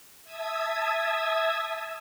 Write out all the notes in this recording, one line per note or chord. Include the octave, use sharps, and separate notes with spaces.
E5 A5 D#6 E6 G#6